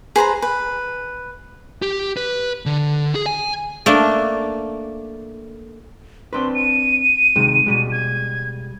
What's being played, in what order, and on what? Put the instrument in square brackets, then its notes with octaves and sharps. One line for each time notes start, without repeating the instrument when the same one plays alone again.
[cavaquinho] G#4 B4 C5 A#5
B4
[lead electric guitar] G4
B4
D3
G#4
G#5
[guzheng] A3 A#3 D4
[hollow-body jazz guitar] C4 D4 B4 [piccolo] C6
[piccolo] D#7
[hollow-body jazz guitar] C3 D#3 G#3
B2 G3 G#3
[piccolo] G#6